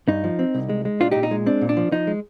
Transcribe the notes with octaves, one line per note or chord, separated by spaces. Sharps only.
G2 D#4
F3
C4
C2
G#3
G#3
A#2 D4 F4
A#2 D#4 G4
D#4
G#3
C4 D4
A#2
D4
F3
F3 D#4
G#3